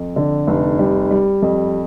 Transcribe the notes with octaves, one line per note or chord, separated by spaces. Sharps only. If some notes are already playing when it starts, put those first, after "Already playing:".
Already playing: F2
D3
F1
G3
G3
F2